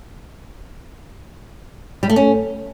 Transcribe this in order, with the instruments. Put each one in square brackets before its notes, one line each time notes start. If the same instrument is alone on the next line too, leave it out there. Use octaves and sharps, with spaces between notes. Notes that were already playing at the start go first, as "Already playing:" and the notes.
[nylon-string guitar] G3
A3
C#4